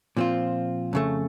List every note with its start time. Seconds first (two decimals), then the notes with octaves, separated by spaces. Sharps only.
0.17 A#2 F3 C4 F4
0.93 F2 C#3 A3